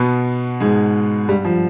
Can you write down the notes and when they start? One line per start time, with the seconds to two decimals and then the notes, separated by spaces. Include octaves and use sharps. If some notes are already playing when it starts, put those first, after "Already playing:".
Already playing: B2 B3
0.60 G#2 G#3
1.29 G2 G3
1.45 F3